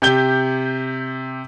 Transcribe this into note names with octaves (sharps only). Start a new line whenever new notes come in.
C3 G4 G6 G7